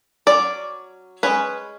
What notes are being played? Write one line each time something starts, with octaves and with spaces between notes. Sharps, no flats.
F#3 C#4 D5
G#3 C#4 B4